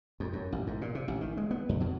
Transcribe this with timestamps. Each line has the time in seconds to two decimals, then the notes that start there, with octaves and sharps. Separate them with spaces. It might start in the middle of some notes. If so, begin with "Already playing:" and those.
0.20 F2
0.33 F#2
0.52 A1
0.67 G#2
0.81 A#2
0.95 C3
1.08 A1
1.21 D#3
1.37 G#3
1.51 B3
1.69 F2
1.80 B2